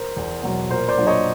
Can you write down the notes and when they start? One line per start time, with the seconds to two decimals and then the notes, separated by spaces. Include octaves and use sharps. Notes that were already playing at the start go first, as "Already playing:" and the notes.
Already playing: A#4 C5
0.17 E2
0.43 B2 F#3
0.70 A#2 A#4 C5
0.88 C5 D5
0.97 F#3 A#3 D4 F4
1.07 C#5 D#5